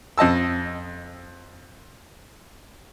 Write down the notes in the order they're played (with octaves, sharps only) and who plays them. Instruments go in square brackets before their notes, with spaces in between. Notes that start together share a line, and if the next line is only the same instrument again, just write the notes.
[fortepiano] F2 D#5 A5 E6